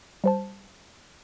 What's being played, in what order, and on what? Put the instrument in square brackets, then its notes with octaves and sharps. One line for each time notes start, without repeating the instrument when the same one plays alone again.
[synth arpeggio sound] G3 C5 A5